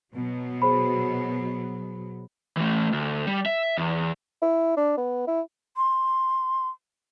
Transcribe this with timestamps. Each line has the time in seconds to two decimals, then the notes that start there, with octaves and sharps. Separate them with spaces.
0.14 B2 F#3
0.62 G#4 C5 B5
2.57 E3 A3
2.93 D2
3.27 G3
3.46 E5
3.78 E2
4.42 E4
4.77 D4
4.97 B3
5.27 E4
5.77 C6